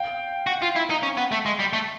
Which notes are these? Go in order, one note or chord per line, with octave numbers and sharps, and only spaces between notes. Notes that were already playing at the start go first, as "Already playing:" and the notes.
Already playing: F5 G5
F#4
F4
E4
D#4
C#4
B3
A3
G#3
G3
A3